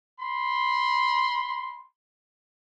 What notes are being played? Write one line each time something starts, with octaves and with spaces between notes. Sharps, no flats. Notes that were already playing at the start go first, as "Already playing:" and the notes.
B5 C6